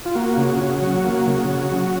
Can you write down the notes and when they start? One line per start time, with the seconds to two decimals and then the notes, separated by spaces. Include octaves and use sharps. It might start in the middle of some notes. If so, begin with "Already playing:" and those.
0.06 F4
0.15 A#3 F#4
0.37 C#3
0.60 C#3
0.82 F#3
1.04 A#3
1.27 C#3
1.48 C#3
1.72 F#3